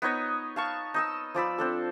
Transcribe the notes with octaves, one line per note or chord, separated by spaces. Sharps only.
B3 D#4 C#5 D#5
F5 A5 C#6
D#4 D#5 E6
F3 D5 B5 E6
C4 D4 A4